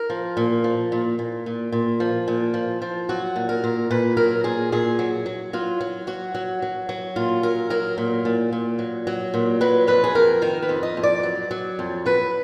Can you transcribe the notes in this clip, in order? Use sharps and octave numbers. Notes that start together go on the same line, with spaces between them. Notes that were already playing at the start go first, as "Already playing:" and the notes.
Already playing: A#4
F3
A#2
F3
A#2
A#2
A#2
A#2
F3
A#2
F3
F3
F#3 F#4
A#2
A#4
A#2
A#2 B4
F#3 A#4
A#2 G#4
A#2 G#4
F#3
F#3
F#3 F4
F#3
F#3 F#4
F#3
F#3
F#3
A#2 F4
F#3 A#4
F#3 A#4
A#2
A#2
A#2
F#3
F#3
A#2
F#3 B4
F2 B4
G#4
F2 A#4
D#3 A#4
B4
F2
D#5
F2
D5
F#3
F#3
F2
F#3 B4